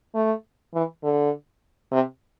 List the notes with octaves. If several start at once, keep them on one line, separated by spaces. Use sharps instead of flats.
A3
E3
D3
C3